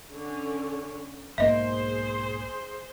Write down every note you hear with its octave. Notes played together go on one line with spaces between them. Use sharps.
D3 C#4
B1 G#2 A#3 G#4 C5 D#5 E5